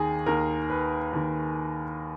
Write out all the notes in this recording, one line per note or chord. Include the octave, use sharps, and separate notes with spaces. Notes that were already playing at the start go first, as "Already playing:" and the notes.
Already playing: D#2 D#3 G#4
D#2 D#3 A#4
B4
D#2 D#3